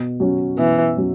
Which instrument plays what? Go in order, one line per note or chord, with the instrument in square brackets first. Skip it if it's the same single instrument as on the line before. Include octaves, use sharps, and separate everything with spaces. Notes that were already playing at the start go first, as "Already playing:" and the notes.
Already playing: [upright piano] B2
F#3 C#4
[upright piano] B2 [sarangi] E3
[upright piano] F#3 C#4